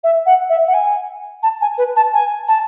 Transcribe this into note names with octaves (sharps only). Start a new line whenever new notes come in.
E5
F#5
E5
F#5
G#5
A5
G#5
B4
A5
G#5
A5